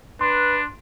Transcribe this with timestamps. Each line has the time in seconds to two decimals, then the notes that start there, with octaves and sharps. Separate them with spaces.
0.21 D4 B4 C6